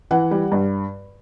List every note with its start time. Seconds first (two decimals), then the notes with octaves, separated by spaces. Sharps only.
0.11 E3 F#5
0.31 G3
0.52 G2